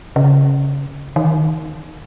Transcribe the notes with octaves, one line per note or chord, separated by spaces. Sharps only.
C#3
D#3